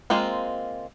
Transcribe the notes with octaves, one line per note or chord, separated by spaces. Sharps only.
G#3 A#3 C4 F4